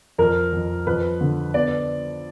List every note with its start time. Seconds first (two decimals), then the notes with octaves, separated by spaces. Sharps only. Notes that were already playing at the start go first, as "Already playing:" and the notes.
0.18 F2 A#4
0.53 F2
0.87 F2 B4
1.21 D3
1.54 B3 D5